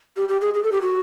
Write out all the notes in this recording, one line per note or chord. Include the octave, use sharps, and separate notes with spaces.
G4
G4
G#4
G#4
A4
G4
F#4